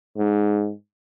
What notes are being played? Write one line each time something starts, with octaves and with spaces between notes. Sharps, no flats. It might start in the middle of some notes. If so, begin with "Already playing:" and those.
G#2